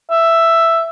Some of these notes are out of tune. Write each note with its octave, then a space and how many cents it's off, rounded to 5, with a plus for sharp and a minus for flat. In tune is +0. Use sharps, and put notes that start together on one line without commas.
E5 +5